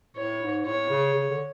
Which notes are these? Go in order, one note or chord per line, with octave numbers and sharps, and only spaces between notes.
A2 C#5
G#2
A2 C#5
C#3
C#3
D3